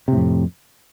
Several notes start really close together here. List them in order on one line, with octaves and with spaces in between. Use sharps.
C3 A2 F2